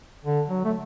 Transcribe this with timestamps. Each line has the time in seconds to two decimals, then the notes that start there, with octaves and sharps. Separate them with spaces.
0.24 D3
0.48 F#3
0.65 A3